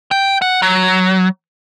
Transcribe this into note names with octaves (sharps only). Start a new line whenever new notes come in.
G5
F#5
F#3